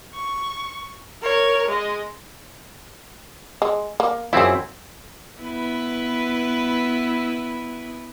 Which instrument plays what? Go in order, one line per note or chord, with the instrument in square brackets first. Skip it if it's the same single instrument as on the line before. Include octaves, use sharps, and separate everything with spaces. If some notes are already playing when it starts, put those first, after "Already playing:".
[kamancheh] C#6
A#4 C#5
G#3 D#5
[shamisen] G#3
A#3
[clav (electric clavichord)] F#2 C4 E4 [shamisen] F4 G#4
[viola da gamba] B3 E4 B4